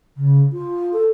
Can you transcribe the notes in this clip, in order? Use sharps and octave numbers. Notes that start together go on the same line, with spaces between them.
C#3
F4
A4